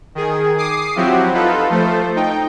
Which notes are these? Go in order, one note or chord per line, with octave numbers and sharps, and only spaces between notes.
D#3 G#4
D6 D#6 C7
F3 F#3 C4 E4 F#4 G4
D#4 F4 A4 B4
F3 A3 A4 C5
D#4 G5